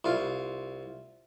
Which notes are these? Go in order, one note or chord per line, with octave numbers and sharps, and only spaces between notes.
C2 F4